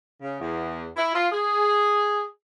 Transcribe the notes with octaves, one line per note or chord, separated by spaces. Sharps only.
C#3
E2
E4
F4
G#4